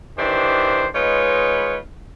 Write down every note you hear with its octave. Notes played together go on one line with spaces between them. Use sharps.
D#3 E3 D4 G4 C5
G#3 D#4 F4 B4 C#5